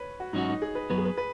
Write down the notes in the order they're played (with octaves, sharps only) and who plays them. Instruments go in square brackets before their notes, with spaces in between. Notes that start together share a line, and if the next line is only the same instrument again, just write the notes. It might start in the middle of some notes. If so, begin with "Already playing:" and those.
Already playing: [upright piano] B4 C#5
F#4
[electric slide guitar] G#2 F#3 C#4 F#4 [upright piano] D#4
[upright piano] D#4
G#4
B4
[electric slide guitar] F#2 F#3 B3 [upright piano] B4
[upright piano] G#4
B4
B4